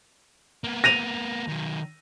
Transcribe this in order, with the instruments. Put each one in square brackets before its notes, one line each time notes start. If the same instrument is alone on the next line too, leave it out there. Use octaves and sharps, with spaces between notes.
[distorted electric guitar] A#3 B3
[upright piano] A#6 D#7 F7
[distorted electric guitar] D#3 F#3